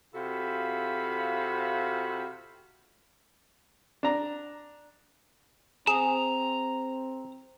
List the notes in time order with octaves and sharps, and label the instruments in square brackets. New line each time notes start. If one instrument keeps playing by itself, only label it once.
[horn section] C3 F4 F#4 A4 F5 B5
[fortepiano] D4 A#5
[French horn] C4 [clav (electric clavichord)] G#4 [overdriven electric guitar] A#5 [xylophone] E7